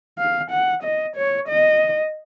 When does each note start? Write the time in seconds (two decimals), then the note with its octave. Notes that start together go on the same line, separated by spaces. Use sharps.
0.18 F5
0.51 F#5
0.83 D#5
1.16 C#5
1.49 D#5